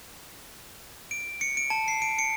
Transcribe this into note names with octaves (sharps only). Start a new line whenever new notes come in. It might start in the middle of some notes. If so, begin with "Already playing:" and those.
D7
C#7
D7
A5
C7
D7
C#7